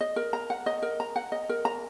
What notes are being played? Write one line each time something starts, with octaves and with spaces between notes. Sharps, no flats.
D#5
A#4
A#5
F#5
D#5
A#4
A#5
F#5
D#5
A#4
A#5